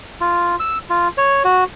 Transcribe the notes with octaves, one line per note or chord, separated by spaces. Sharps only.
F4
E6
F4
C#5
F#4